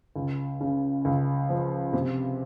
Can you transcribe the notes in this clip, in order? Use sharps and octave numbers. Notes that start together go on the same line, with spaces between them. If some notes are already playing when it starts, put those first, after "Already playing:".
C#2
C#3
C#2
F3
C3